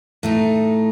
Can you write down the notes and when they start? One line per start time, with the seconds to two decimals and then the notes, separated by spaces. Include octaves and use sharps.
0.23 A2 A3 D#4